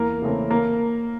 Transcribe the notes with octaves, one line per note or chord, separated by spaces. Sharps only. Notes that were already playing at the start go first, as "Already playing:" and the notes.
Already playing: E2 A#3 A#4
C#3 E3 A3 C4
A#3 A#4